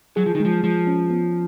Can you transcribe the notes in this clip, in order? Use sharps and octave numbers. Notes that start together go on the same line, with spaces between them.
F#3 G#4
F3
D#3
F3 G#3
F3 G#3
C#4
B3